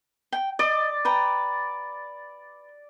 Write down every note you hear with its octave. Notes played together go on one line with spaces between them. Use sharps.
G5
D5 D#5
B4 G5 A#5